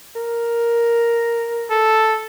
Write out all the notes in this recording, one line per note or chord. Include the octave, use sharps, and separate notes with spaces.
A#4
A4